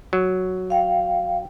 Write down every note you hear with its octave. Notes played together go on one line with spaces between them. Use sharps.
F#3
F5 G5